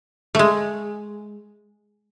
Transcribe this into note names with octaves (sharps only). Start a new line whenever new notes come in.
G#3 A3